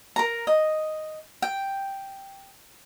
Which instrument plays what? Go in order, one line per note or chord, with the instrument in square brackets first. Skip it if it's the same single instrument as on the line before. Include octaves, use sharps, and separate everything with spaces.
[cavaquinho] A#4 A#5
D#5
G5